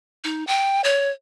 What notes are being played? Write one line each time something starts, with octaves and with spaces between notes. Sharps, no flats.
D#4
G5
C#5